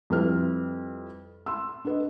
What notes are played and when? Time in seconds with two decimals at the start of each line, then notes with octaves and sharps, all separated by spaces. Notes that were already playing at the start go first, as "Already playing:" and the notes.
0.10 F2 G3 E4 B4 F6
1.46 C6 E6
1.85 D4 B4 D#5